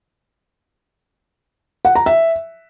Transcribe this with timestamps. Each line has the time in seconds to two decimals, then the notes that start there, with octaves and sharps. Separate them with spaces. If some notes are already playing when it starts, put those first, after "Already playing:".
1.85 F#5
1.95 A#5
2.06 E5